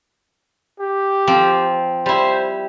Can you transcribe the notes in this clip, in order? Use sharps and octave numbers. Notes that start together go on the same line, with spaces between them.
G4
F3 C4
G3 E4 C5